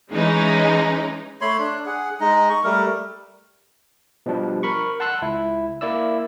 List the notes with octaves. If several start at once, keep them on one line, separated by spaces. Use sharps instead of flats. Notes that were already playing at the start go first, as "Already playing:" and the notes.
E3 G#3 C#4 D#4
A3 C#5 B5 C6
D4
G#4 F#5
G#3 D#4 D#5
C#6
G3 A3 A#4
B2 F3 G3 D4
A#4 B5 C#6
F#5 A5 C6 E6 F#6
C#2 E4
A#3 E4 D5 E6